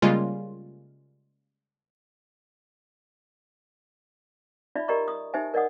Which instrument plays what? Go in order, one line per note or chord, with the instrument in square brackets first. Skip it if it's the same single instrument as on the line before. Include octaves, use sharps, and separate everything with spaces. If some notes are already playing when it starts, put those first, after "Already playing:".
[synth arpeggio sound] C#3 G3 G#3 A#3 C#4 F4
[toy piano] D#4 F4 D5 E5 B5
G4 A#4 D5 D#5 A#5 C#6
D#6
D#4 G4 C5 E5 G#5
A#4 D5 D#5 F#5 D#6